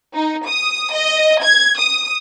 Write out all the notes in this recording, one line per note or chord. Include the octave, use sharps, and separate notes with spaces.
D#4
D#6
D#5
G#6
D#6